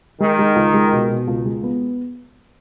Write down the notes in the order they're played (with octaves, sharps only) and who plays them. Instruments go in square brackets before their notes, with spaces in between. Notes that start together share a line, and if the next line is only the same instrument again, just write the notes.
[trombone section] D#3 [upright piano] G#3
[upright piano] G#3
C#2
G#3
B2
B2
C#2
G#3
B3